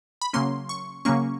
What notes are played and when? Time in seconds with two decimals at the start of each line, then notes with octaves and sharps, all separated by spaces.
0.21 B5
0.33 C#3 F#3 A#3 C#4 C6
0.69 C#6
1.05 C#3 F#3 A#3 C#4 C#6